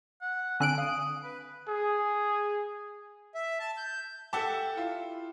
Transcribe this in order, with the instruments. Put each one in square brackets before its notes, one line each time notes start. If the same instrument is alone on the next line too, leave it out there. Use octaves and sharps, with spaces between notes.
[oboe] F#5
[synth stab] D3 F#6 D7 [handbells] C4 G#5 E6
[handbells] F5 [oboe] D#6
[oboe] B4
[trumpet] G#4
[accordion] E5
A5
G6
[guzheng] G4 E5 [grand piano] A4 F#5 A5
[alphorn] E4 [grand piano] F4